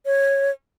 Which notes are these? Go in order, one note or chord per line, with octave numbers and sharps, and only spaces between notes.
C#5